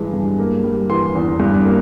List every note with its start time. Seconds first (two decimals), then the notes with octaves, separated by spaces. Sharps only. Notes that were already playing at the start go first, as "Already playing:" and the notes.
Already playing: G2 E3 G#3
0.13 G2
0.39 A#3
0.64 G3
0.90 E3 C6
1.15 E2
1.40 G2
1.65 A#3